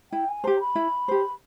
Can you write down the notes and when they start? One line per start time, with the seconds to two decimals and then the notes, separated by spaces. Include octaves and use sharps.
0.12 E4 G5
0.28 G#5
0.44 G4 C5 A#5
0.60 B5
0.75 E4
1.08 G4 C5